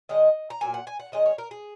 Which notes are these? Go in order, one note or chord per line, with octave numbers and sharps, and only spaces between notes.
D#3 G#3 C#4 D#5
A#5
A#2 F#3 A#3 G#5
F#5
G#5
F#5
D#3 G#3 C#4 D#5
C#5
A#4
G#4